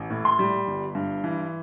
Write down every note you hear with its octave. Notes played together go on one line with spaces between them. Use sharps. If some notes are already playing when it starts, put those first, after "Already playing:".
Already playing: A1
A2
C6
G3
G1
G2
E3